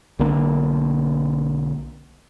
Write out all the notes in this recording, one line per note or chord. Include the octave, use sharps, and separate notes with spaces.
B1 D3 A#3 D4